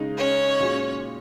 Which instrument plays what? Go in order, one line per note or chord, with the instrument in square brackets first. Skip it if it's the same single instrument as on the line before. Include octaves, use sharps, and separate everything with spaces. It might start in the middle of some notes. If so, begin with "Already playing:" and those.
Already playing: [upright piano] C#3 G#3 D#4
[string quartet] C#4 C#5
[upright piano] A#2 G#3 F#4